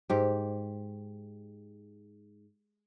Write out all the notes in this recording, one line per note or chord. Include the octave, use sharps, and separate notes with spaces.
G#2 G4